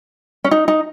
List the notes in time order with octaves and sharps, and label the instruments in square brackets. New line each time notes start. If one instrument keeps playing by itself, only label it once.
[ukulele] C#4
D#4
D#4